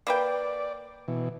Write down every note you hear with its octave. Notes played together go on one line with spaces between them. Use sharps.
A#3 B4 D5 G5
B2 E3